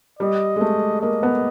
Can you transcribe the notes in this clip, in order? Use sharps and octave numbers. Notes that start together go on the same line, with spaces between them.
G3 D#5
G#3
A3
A#3 D#5
B3